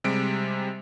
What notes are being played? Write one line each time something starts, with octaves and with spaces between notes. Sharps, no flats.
C3 G3 G#3 D7